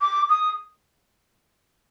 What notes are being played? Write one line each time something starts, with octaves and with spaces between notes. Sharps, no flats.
D6
D#6